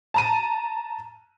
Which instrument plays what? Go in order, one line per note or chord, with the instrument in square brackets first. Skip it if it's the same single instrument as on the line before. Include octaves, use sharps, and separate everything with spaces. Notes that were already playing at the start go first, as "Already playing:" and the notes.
[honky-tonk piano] A5 A#5 D#7